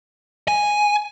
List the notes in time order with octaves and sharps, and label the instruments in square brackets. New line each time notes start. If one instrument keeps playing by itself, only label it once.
[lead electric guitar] G#5